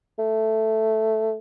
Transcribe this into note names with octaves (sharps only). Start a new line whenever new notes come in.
A3